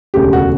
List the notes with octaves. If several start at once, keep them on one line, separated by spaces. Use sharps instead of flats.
E1 D2 C#3 G4
F#4